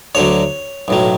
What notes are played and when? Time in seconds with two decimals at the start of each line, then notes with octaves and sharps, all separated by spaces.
0.15 D2 D3 F#3 C#5
0.88 B1 A2 F#3